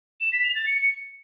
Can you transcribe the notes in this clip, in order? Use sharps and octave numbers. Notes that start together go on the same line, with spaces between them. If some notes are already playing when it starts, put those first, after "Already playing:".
E7
B6
F7
A6
C#7